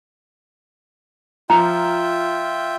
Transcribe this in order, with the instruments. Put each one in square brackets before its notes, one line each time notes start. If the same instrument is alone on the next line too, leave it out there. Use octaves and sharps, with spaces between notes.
[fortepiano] F3 [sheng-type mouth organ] F4 E5 G5 [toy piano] A#5